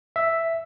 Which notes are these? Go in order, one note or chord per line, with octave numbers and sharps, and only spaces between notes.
E5